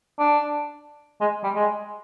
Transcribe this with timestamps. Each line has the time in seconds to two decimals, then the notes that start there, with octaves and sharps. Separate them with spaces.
0.19 D4
1.21 G#3
1.43 G3
1.55 G#3